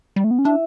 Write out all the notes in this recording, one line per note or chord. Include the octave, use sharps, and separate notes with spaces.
G3
A3
B3
C#4
D4 E4 E5